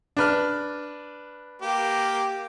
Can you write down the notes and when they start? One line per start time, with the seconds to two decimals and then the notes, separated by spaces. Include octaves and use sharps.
0.17 D4 B4 F6
1.62 A#3 G4